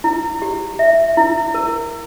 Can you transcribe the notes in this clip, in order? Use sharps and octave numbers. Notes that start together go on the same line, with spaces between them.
E4
G4
E5
E4
A#4